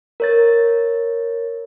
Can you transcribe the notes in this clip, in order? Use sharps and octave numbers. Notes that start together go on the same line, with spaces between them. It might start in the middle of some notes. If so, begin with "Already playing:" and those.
A#4 C#5 A6